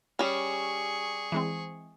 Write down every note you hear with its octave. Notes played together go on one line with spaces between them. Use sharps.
G3 C#4 G#4 C#6
E3 G#3 C4